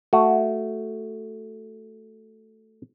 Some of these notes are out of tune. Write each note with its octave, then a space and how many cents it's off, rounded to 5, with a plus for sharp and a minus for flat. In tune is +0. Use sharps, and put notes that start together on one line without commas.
A3 +0 F#4 +0